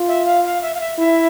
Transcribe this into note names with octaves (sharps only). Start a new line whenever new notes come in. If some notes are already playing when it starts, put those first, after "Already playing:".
Already playing: F4
E5
F5
F5
E5
F5
E5
E4 E5